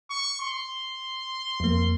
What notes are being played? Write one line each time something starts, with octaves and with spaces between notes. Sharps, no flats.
C#6
C6
F2 A#3